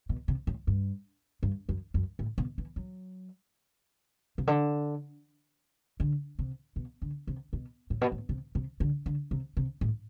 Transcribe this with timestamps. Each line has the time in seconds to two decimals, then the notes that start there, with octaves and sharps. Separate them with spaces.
0.09 B2
0.28 C3
0.47 A2
0.67 G2
1.43 G2
1.69 F#2
1.94 F#2
2.19 A2
2.38 B2
2.58 E3
2.76 F#3
4.38 C3
4.47 D3
6.00 D3
6.39 C3
6.76 B2
7.02 D3
7.27 C3
7.53 B2
7.90 A2
8.01 B2
8.12 A2
8.29 C3
8.55 C3
8.80 D3
9.06 D3
9.31 C3
9.57 C3
9.81 A2